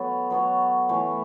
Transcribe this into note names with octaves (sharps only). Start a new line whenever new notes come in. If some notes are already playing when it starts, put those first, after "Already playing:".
Already playing: F#3 B3 A4 C#5
F#3 B3 A4 C#5
E3 A3 E4 C#5